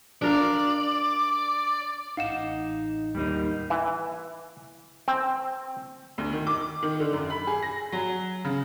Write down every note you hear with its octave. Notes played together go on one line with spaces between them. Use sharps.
D4 A#4 D5 F5
A1 D#4 F5 F#5 E7
D#2 G3 A#3 D#4
E3
C4
D2
D#3
D6
D#3
D3
F#2
B5
G#4
A#6
F#3
C#3